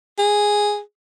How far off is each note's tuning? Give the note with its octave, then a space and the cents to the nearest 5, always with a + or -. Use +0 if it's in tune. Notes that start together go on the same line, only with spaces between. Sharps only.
G#4 -5